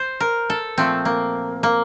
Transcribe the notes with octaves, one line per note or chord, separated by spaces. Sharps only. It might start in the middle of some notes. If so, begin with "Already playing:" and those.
Already playing: C5
A#4
A4
A#2 F3 A3 C4
A#3
A#3